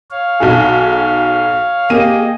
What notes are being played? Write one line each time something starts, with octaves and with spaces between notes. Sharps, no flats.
C#5 F5
B1 F#4 G#4
A#3 G4 G#4 D#5 D#7